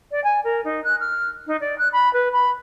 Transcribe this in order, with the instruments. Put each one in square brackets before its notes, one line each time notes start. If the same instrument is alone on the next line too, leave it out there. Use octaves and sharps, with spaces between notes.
[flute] D5
G#5
A#4
D#4
F#6
F6
D#4
D5
F#6
B5
B4
B5